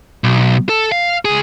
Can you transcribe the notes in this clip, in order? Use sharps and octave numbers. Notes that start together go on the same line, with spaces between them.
B1
A4
F5
C#2 G#4